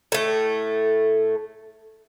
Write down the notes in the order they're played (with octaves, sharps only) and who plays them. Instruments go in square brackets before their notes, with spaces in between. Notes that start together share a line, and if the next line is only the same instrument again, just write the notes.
[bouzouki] A2 A3